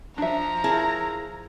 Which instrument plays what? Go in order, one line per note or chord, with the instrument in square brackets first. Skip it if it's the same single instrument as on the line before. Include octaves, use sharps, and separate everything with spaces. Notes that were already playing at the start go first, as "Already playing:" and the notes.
[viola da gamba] F3 [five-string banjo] D4 E5 [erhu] A#5
[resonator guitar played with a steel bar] E4 G#4 A#4 [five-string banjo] A5